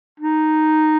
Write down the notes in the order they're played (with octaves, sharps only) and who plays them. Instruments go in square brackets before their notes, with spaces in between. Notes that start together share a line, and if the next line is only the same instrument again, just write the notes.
[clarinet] D#4